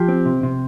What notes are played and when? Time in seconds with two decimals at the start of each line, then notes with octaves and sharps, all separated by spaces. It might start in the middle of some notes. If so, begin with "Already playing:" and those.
Already playing: F3 G4
0.08 C4
0.26 C3
0.43 C3